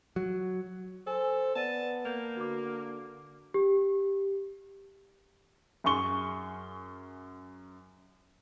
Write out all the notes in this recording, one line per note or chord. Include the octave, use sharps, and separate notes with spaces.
F#3
A4 C5 G#5
B3 D5 A5 A6 D#7
A#3 G6 F7
D3 F#4 D6
G4
F#2 G#4 C6 C#6 G7